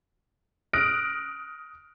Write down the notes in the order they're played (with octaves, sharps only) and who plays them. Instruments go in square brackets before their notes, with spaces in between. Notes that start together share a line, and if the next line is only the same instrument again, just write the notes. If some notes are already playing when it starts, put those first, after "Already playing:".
[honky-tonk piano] D#6 F6 F#6 A#6 D7